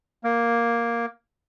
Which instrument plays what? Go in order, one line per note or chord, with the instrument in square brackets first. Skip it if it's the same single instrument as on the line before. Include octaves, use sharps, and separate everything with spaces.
[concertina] A#3